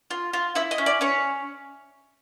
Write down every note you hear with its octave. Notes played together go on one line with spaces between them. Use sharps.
F4
F4
E4 E5
D#5
C#4
D5
C#4 C#5